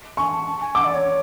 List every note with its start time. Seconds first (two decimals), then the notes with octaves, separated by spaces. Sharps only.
0.17 G#5 C#6
0.32 A5
0.47 A5
0.61 G#5
0.75 F#5 D6
0.85 D5
0.94 C#5